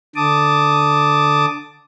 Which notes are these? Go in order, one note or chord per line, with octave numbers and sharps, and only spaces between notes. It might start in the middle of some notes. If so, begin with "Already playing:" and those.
D3 A5 D6 D#6